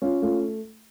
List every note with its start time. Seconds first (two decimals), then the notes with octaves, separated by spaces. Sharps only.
0.02 C#4 F4
0.22 A3 F4